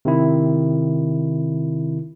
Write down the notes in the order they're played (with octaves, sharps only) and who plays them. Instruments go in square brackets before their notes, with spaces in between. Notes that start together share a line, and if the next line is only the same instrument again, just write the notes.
[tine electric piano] C3 D#3 E4